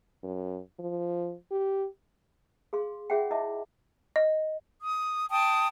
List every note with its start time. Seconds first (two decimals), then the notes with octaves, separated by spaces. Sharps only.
0.23 F#2
0.79 F3
1.51 G4
2.73 G#4 F5 C6
3.10 F4 G#4 C#5 E5 F#5 G5
3.31 E4 D#5 E5 A5 B5 D6
4.16 D#5
4.81 D#6
5.30 G5 A5 D#6